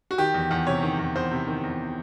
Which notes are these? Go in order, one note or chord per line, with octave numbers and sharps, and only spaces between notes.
F#4
D#3 G4
E2
E2
C3 C#5
D#3
E2
E2 C5
C3
D#3
E2